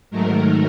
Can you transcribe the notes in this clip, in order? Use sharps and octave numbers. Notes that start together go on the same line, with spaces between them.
G#2 D#3 F#3 A3 A#4